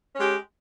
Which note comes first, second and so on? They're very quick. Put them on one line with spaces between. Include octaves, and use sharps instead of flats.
C#4 G#3 G4